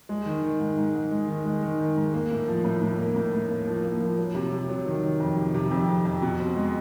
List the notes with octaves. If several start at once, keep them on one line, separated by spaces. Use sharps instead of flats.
G#3
D#3
D#3
G#2
G#2
G#2
G#3
D#3
G#3
D#3
D#3
G#2
A#3
A2
F3
A2
A2
A#3
A2
A2
A#3
F3
A#3
F3
F#3
C3
C3
F#3
D#3
D#3
F2
C3
C3
F2
F2
F2
B2
C4
G#3